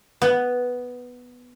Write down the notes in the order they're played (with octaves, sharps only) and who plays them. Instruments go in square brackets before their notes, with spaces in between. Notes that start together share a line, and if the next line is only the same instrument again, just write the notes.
[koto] B3